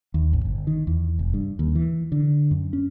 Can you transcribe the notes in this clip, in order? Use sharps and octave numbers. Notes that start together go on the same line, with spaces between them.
D#2
A1
G1
D#3
E2
F1
G2
D#2
E3
D3
F#2
C#4